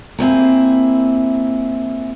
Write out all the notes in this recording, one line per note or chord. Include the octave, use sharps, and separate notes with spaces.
A#3 C4 E4 G#4